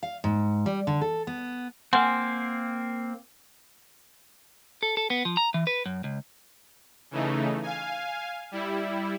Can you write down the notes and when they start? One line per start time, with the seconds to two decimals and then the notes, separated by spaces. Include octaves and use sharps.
0.03 F5
0.24 G#2
0.66 G3
0.87 D3
1.01 A4
1.27 B3
1.93 A#3 C4 F#5 G#5 C6
4.83 A4
4.97 A4
5.10 B3
5.25 F3
5.37 A#5
5.54 E3
5.67 B4
5.86 F#2
6.04 C#2
7.11 C#3 E3 A3 D#4
7.63 F5 G#5
8.51 G3 E4